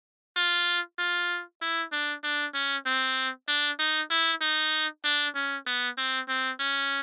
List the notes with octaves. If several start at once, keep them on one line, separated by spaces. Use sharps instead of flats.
F4
F4
E4
D4
D4
C#4
C4
D4
D#4
E4
D#4
D4
C#4
B3
C4
C4
C#4